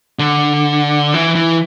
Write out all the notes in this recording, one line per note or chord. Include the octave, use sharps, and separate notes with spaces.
D3
E3
E3